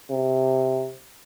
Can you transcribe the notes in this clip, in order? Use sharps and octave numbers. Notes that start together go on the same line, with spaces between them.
C3